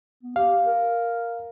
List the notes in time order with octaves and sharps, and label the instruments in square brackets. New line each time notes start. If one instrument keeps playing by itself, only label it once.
[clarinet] B3
[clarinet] G4 [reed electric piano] F5
[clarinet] A#4